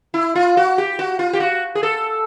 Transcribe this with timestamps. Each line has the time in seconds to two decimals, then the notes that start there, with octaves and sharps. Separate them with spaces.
0.14 E4
0.36 F4
0.57 F#4
0.78 G4
0.99 F#4
1.19 F4
1.33 G4
1.40 F#4
1.75 G#4
1.83 A4